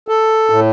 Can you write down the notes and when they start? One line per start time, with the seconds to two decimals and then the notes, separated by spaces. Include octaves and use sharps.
0.08 A4
0.50 A2